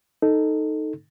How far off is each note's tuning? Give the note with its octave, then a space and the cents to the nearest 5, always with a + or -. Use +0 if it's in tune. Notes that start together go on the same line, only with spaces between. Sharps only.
D#4 +0 A4 +0